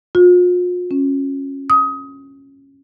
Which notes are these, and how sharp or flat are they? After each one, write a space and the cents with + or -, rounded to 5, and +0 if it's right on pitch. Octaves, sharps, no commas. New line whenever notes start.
F4 +40
C#4 -15
D#6 +20